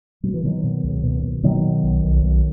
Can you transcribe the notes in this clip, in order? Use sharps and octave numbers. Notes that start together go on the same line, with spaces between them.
B2 F#3
E3
B2 D#3 F#3
B2
C#2
B2
B2
B2 D#3 F#3
B2
B1
B1
B1